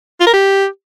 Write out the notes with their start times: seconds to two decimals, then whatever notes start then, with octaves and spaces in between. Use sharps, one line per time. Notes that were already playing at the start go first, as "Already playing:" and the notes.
0.20 F4
0.27 A#4
0.33 G4